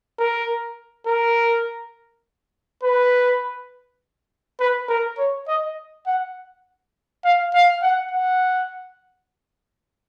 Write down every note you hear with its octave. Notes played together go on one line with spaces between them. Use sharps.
A#4
A#4
B4
B4
A#4
C#5
D#5
F#5
F5
F5
F#5
F#5